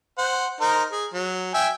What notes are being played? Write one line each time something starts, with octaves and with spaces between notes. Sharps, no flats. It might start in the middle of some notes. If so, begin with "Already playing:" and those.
C5 F#5
D#4 A#4 C5
G#4
F#3
E5 G5 G#5